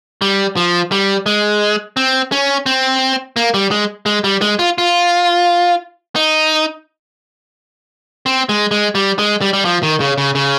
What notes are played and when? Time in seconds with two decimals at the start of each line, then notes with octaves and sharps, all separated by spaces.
0.22 G3
0.57 F3
0.92 G3
1.26 G#3
1.97 C4
2.32 C#4
2.66 C4
3.36 A#3
3.54 G3
3.71 G#3
4.06 G#3
4.24 G3
4.41 G#3
4.59 F4
4.78 F4
6.16 D#4
8.26 C4
8.49 G#3
8.71 G#3
8.95 G3
9.19 G#3
9.41 G3
9.53 G3
9.65 F3
9.83 D#3
10.00 C#3
10.18 C#3
10.35 C#3